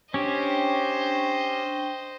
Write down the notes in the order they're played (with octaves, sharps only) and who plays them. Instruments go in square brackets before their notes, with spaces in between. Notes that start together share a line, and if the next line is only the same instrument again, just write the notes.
[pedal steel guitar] C#4 G4 [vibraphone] D4 G5 C#6 [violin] C5 D#5